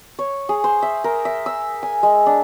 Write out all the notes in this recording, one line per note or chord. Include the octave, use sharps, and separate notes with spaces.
C#5
G#4
C5
E5
A#4
E5
E6
G#5
G#3
D4